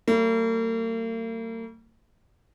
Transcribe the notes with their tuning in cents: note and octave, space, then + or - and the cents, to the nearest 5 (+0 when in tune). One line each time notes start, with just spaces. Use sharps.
G3 -35 A#3 -45